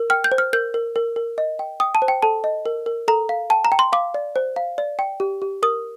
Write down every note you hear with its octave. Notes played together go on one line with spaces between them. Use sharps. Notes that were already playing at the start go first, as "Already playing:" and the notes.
Already playing: A#4
G5 F6
G6
C5
F6
A#4 G6
A#4
A#4
A#4
D#5
G5
G5 D#6
A5
C5
G5
A4 A5
D#5
A#4
A#4
A4 A#5
F5
G5 A5
A#5
G5
C6
F5 D6
D5
C5
F5
D5
G5
G4
G4
A#4 D#6